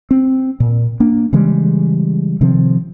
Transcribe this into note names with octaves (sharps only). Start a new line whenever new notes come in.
C4
A#2
A#3 D4
C#3 E3 G3 G#3
C3 D#3 F3 C4